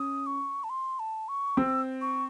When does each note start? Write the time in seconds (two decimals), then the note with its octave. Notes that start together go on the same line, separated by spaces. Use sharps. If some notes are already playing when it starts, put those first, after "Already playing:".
Already playing: C#4 D#6
0.26 C#6
0.64 A5
0.69 C6
0.99 A5
1.28 C#6
1.57 C4 E6
2.01 C#6